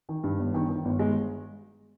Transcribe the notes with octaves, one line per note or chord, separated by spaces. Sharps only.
D#3
G2
G1
D#3
D#3
G1
G#3